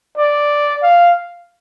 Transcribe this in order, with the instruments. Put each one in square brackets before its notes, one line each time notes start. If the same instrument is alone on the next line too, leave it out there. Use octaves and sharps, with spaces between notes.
[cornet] D5
F5